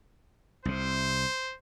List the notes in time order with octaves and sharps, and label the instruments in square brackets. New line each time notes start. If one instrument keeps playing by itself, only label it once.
[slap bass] C2 C3 [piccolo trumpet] C5